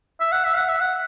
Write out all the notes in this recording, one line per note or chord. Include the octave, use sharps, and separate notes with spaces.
E5
F#5
E5
F#5
E5
F#5